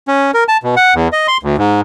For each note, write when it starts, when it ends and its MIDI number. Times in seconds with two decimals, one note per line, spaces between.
0.08 0.31 61
0.34 0.44 70
0.48 0.57 81
0.63 0.75 47
0.77 0.94 78
0.95 1.08 40
1.13 1.27 75
1.28 1.38 84
1.43 1.56 38
1.58 1.81 44